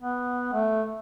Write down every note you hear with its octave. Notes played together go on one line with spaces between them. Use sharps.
B3
A3